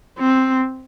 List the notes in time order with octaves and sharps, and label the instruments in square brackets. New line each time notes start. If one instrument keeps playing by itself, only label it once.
[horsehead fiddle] C4